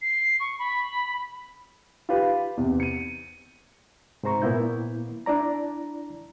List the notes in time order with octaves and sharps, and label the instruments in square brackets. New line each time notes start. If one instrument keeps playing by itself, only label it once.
[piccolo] C7
C#6
B5
[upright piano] F4 G4 B4
E2 C3
C#7 D#7
[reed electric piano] G#2 C3 C5 A#5 C#6
A#2 A#3 B3 E4 G6
D4 E4 D5 A#5